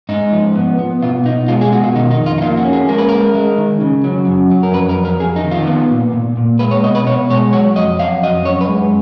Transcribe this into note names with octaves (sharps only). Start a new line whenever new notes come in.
G#2 D#4
F3
B3
B3
B2 F4
B2 D#4
G#3 F4
G#4
B2 F#4
F4
D#3 D#4
D#4
F2
F4
D#4
A#3 F4
F#4
C#4
G#4
G#3 A#4
B4
G#3 A#4
G#3
D#3
C#3
F#3
F#2
F#3
A#4
F2 B4
A#4
F2
A#4
F2 G#4
D#4
D#3
F4
B3
A#2
A#2
A#2
G#3 B4
C#5
B2 D#5
B4
B2 C#5
G#3 C#5
F#3 C#5
F2 D#5
F#3 F5
F2 D#5
F#2 C#5
B4
G#3